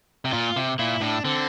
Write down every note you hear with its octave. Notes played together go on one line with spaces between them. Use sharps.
C3
A#2 F4
C3
A#2 E4
A2 D4
D3 C4